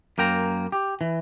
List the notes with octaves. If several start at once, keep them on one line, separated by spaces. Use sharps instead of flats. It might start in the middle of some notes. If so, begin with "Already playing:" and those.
F#2 A#3 G5 A#5
G4
E3